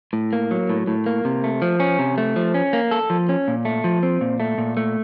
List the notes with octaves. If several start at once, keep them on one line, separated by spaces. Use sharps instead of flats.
A2
A#3
F#3
A2
A2
A#3
C3
A3
F3
C#4
C3
A3
F3
C#4
A#3
A4
F3
C#4
A#2
A3
F3
C4
A#2
A3
A#2
A3